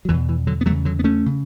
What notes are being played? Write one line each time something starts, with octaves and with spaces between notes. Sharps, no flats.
F#3
E2 B2 E3
E3
D3 F#3
B3
E2 C#3 F#3 A3
D3 F#3
B3
A3 C#4
C#3